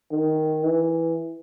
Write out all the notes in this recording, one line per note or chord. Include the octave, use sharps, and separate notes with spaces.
D#3
E3